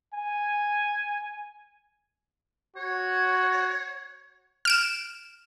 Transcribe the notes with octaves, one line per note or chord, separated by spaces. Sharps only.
G#5
F#4 C#5
F6 D7 E7